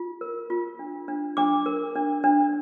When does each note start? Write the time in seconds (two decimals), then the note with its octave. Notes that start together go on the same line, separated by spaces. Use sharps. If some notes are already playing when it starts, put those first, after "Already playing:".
Already playing: F4
0.21 A#4
0.50 F4
0.79 D4
1.08 D4
1.37 D4 D6
1.66 A#4
1.95 D4
2.24 D4